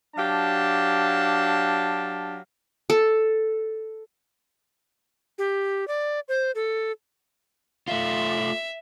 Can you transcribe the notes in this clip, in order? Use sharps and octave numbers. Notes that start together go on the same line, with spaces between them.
F#3 D4 G4 F5 A5
A4
G4
D5
C5
A4
A3 F4 E5